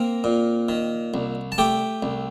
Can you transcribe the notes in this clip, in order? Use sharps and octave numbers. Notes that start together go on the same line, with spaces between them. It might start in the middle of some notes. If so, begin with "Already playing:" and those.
Already playing: A#3 C4 A#4
A#2
D#3
C2
A5
A3 G4 G5
C2